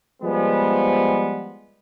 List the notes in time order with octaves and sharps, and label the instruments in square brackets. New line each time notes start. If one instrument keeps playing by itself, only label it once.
[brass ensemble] F3 G3 G#3 B3